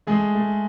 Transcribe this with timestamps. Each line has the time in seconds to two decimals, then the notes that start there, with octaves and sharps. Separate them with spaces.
0.07 G#3 A3 G#4
0.35 A3